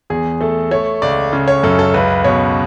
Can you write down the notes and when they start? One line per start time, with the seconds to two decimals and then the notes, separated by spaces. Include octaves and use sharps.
0.10 E2 G#4
0.41 A3 A4
0.71 A3 C#5
1.02 C#2 D5
1.33 C#3
1.48 C#5
1.63 F#2 A4
1.79 A4
1.94 C#2 B4
2.24 B2 C#5